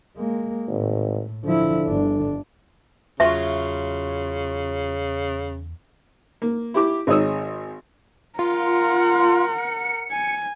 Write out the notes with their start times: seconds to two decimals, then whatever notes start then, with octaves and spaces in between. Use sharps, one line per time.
0.16 G#3 A#3
0.68 G#1 A2
1.44 D3 F3 E4
1.86 G1 D4
3.20 E2 C#3 F#3 F4 F#4 E5
6.42 A#3
6.74 E4 G4 D6
7.07 G#1 G#3 D#4 C#5 D#6 E6
8.39 F4 A#4 F#5
9.58 C#7
10.12 G#5